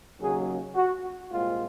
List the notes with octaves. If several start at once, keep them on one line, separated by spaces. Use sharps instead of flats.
D#2 C#3 F#3 A#3 G#4
F#4
C2 A#2 G#3 C4 F4